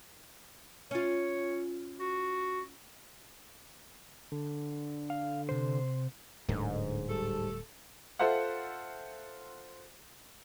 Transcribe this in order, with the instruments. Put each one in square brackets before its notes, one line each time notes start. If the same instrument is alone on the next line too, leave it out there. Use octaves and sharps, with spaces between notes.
[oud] C#4 F4 [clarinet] C#5
[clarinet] F#4
[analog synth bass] D3
[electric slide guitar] F5
C3 C5
[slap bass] D1 [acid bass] G#2 [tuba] D3
[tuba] G3 [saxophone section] A3 A4
[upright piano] F4 A4 C5 E5 F#5